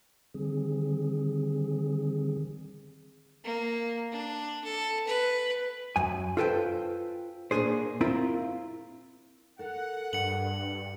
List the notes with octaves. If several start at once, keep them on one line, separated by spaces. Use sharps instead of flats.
D3 D#3 G3 C4 G#4
A#3
D4
A4
B4
F#2 G#5
F4 F#4 A4 B4 C5 G5
A#2 A#3 C#4 D4 G#4 C5
C4 E4 F4 A#4
A4 A#4 F#5
G2 C#7 F#7